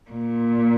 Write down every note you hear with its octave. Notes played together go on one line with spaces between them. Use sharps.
A#2